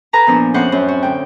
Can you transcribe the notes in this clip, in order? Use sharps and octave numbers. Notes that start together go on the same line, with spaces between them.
A4 B4 G#5 A#5
A#2 F3 B3 D4
F2 A2 C#4 C5 F#5 F#6
F#2 A2
F#4
D2 G5